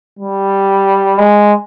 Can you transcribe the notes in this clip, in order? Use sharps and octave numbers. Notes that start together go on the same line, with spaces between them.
G3
G#3